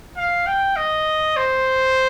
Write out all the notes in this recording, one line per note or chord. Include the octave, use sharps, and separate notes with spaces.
F5
G5
D#5
C5